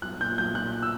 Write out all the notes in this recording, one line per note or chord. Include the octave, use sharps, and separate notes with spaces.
B1 F#6
A#2 G6
B1 G6
A#2 F#6
E6